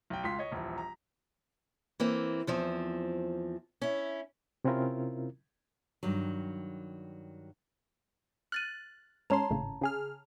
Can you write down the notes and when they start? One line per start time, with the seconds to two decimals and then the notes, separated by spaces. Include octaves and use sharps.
0.10 B1 G5
0.23 C#2 F4 C6 B6
0.39 C#5 D#5
0.52 D#1 A#1 E3
0.78 A#5
2.00 E3 A#3 C4
2.47 E2 F3 C4
3.81 C#4 E4
4.64 C3 C4 C#4 E4 F4 A#4
6.03 G2 D#3 F#3
8.52 F6 F#6 A6 D#7
9.30 G#2 C#4 C#5 A5 A#5 C6
9.50 G#1 A2 C#3
9.82 C#3 G#4 F6